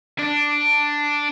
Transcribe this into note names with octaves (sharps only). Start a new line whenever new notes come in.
D4